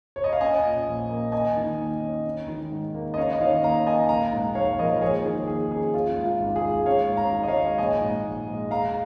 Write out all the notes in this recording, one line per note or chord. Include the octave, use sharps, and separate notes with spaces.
C#5
D#5
F5
C#4 D#5 G#5
A#2
A#1
A#3
D#2 D#5 G#5
D#3
D#2
C#4
C#4
D#3
G#2
A#3
D#5
C#4 C#5 F5
D#5
D#3 C#5 F5
D#2 F5 A#5
A#3 D#5 G#5
A#1 F5 A#5
G#2
A#1 C#5 F5
F3 A#4 D#5
D#2 G#4 C#5
D#3 G#4
D#2 G#4
C#4 G#4
C#4 F4
G#2
F4
G#1
G#4
G#3
C#4 C#5 F5
G#2
F5 A#5
G#1
D#5
C#5 F5
G#3
A#1 D#5 G#5
G#2
A#1
G#3
G#3 F5 A#5